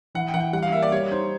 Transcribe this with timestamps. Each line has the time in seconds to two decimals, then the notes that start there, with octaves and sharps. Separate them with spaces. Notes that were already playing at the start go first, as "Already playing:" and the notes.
0.15 E3 F#5
0.28 G5
0.34 E3 F#5
0.40 G5
0.53 G3 F#5
0.63 F5
0.72 A#3 E5
0.82 D5
0.92 G3 C#5
1.12 D#4 C5